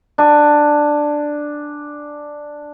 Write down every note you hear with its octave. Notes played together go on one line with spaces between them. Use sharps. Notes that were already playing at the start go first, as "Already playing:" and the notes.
D4 G#5